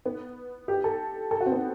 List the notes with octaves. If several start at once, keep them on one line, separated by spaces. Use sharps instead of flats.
B3
G4
A4
A4
F#4
C4
B3